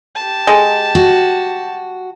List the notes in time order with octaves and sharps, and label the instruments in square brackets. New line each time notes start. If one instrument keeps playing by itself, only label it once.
[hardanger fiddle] G4 A5
[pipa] G#3
[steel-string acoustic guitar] F#4